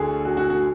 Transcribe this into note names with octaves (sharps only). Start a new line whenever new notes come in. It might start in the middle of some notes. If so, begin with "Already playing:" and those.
Already playing: D2 D3 G#4 A4
F#4
F#4
F#4